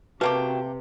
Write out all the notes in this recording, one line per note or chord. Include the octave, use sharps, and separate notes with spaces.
C3 A3 A#3 F#4 G4 B4 G5 A5